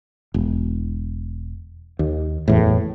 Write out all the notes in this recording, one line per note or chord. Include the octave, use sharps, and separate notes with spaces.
E1
D#2
F#1 E2 A2